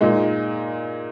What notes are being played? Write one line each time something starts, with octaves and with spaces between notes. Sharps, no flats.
A#2 G#3 D#4